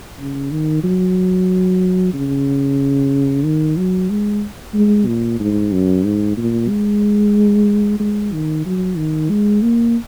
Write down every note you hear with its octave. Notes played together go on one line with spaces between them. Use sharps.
C#3
D#3
F#3
C#3
D#3
F#3
G#3
G#3
A#2
G#2
F#2
G#2
A#2
G#3
G#3
D#3
F#3
D#3
G#3
A#3